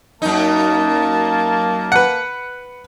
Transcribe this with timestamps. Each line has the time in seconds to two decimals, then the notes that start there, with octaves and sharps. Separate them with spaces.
0.22 F#2 A#3 D#4 A5
1.92 B4 F#5